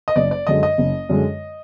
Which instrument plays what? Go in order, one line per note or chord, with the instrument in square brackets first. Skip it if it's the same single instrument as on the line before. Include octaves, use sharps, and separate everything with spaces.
[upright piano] D#5
[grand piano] F#1 [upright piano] D5
[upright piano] D5
[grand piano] F#2 D3 G#3 [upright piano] D#5
[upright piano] D#5
[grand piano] F#1
F#2 D3 G#3